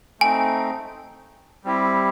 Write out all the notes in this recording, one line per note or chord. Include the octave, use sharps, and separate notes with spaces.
A3 C4 D#4 G#5
G3 C4 E4 G4